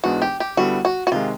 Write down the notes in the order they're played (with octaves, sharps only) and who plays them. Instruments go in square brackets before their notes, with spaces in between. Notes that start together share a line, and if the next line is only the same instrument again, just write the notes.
[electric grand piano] G#2 E3 G#3 B3 D4 [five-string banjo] F#4
[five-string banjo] G4
G4
[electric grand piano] D3 G3 B3 E4 [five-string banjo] F#4
[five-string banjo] F#4
F#4
[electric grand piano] C3 D#3 G#3 [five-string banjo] F4